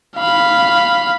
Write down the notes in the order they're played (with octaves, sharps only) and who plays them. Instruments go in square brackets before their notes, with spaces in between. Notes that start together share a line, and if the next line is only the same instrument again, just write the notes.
[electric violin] F5 B5